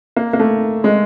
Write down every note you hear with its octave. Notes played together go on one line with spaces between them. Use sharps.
A#3
A#3
A3
G#3